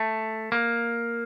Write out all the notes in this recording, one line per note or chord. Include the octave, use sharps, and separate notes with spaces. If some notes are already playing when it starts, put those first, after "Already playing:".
Already playing: A3
A#3